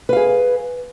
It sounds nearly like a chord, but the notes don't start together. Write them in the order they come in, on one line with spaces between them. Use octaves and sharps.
B4 F5 G#4